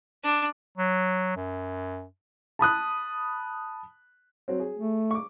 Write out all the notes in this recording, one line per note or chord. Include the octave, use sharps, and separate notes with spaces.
D4
F#3
F#2
A5 B5 D#6 F#6
F#3 C4
G#4
A3
C#6 D6